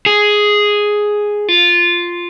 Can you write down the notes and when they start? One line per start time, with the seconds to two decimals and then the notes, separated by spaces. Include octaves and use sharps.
0.06 G#4
1.48 F4